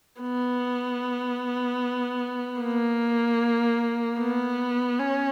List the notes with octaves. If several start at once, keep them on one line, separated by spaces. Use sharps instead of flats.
B3
A#3
B3
C#4